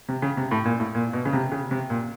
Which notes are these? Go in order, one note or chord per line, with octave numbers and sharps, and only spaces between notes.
C3
C#3
C3
A2
A#2
A2
A#2
B2
C#3
C3
C#3
C3
A#2